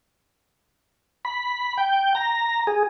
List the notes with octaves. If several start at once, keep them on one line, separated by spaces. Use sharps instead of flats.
B5
G5
A#5
G#4